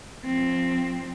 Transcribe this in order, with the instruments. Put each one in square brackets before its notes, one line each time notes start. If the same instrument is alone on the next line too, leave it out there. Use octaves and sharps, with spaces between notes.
[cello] F3 C4